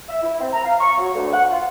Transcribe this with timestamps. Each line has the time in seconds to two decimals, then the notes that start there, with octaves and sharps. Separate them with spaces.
0.09 E5
0.22 E4
0.41 C4
0.53 A#5
0.64 F5
0.81 C#6
0.99 F#3
1.15 D2
1.33 F#5
1.51 F4